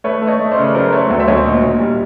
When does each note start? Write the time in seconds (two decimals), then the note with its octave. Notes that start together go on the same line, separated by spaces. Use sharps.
0.04 A3 B4 C#5
0.22 A3
0.28 C#5 D#5
0.39 A3
0.51 C5 D5
0.57 C#3
0.64 B4
0.74 F#3 A#4 C5
0.92 A3 B4 C#5
1.10 D2
1.20 E5
1.28 D2 C#5 D#5
1.45 A#2
1.64 A#2
1.80 G3